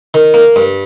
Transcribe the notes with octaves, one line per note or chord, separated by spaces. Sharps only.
D#3
A#3
G2